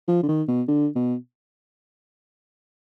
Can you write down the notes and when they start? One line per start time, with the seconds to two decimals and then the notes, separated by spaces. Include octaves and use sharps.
0.08 F3
0.23 D3
0.29 D#3
0.48 B2
0.68 D3
0.96 B2